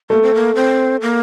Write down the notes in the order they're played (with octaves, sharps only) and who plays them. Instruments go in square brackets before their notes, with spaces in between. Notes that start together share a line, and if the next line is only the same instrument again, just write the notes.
[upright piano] A3 [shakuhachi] A#3
[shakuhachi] C4
A#3
C4
A#3